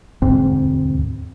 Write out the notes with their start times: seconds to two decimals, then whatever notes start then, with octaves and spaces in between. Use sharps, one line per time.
0.22 E1 D2 G#2 C4